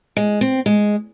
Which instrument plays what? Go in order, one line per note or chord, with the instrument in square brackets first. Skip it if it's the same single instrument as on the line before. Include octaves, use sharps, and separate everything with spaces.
[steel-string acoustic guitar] G#3
C4
G#3